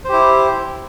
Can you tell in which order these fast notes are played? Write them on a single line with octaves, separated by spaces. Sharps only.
C5 G4 E4